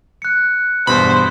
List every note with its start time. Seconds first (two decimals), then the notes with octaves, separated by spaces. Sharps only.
0.22 F#6 C#7
0.87 E2 G2 B2 C5 B5